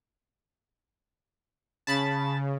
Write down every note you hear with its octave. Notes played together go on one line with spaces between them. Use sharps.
C#3 A5 B5 A6